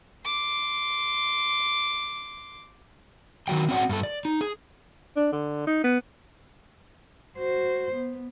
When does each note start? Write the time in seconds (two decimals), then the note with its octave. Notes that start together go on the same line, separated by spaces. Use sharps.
0.25 C6 D6
3.48 D#3 F3 F#3 G5
3.69 C4 C#4 F#4 C#5 D5 F#5
3.89 G2 A4
4.03 D5
4.25 D#4
4.41 G#4
5.16 D4
5.33 D3
5.67 D#4
5.84 B3
7.37 F#4 C5
7.93 B3